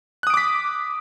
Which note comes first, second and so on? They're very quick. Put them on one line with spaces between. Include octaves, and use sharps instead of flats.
F#6 D#6 D7 D6 B6